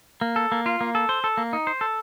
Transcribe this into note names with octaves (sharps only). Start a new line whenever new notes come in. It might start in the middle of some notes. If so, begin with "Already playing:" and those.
A#3
A4
A#3
F4
A#3
A4
C5
A4
A#3
D#4
C5
A4